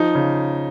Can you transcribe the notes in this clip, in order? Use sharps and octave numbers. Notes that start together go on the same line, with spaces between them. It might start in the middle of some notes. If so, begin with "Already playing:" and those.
Already playing: F3 D#4
C#3